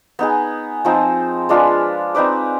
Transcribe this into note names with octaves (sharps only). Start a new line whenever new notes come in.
B3 D#4 G#4
F3 C4 D#4
G#3 D4 F4 B4
C4 D#4 B4 D5